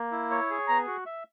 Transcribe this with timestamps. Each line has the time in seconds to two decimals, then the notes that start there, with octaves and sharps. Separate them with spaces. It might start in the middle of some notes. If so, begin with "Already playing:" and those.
Already playing: A#3
0.11 E4
0.31 C#5
0.50 G#4
0.68 B3 A#5
0.86 F#4
1.06 E5